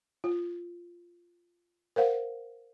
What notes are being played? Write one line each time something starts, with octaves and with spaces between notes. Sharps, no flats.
F4
A#4 C5 F5 F#5